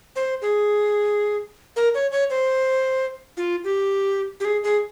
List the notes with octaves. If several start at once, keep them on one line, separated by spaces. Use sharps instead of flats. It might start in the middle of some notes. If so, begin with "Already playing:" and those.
C5
G#4
A#4
C#5
C#5
C5
F4
G4
G4
G#4
G#4